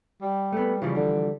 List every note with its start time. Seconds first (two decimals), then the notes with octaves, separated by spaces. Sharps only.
0.21 G3
0.53 A3 B3
0.82 C#3 E3 F3 G3
0.95 D3